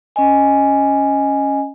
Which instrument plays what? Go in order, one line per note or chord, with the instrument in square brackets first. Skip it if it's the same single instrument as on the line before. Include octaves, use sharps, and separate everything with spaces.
[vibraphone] C#4 D#5 G#5